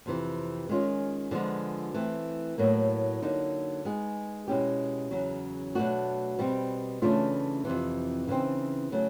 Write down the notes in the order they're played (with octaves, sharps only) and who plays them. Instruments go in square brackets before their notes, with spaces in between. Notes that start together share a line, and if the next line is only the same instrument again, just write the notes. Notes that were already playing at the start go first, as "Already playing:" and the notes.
[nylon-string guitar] F2 C3 E3
D#3 G#3 C#4 F4
D3 F3 G#3 B3
E3 A3 C4
A2 F#3 A#3
D3 F#3 A#3 D#4
G#3 B3 D#4 G#4
B2 G#3 C#4 E4 G4
E2 C#3 F#3
B2 F#3 A3 D4 F#4
B2 G3 C4
C#3 E3 A3 D4 F4
F2 C3 E3
C#3 E3 G3 C4 D#4
C#3 F#3 A3